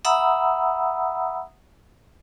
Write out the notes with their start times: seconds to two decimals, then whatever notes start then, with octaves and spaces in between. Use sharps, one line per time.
0.05 E5 F#5 A#5 B5 D#6 E6